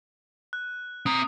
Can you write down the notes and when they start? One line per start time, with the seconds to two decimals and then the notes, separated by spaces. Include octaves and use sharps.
0.53 F#6
1.06 C4 A#5 D#6